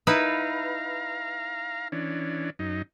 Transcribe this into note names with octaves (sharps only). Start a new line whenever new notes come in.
D#4 E4 B4 F5 A#5
E3 C#4 D4
F#2 D#4